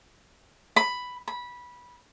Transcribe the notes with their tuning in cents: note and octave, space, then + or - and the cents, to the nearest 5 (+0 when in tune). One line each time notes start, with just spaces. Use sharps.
B5 +5
B5 -15